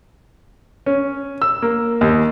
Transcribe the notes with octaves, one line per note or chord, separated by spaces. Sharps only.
C#4
E6
A#3
D#2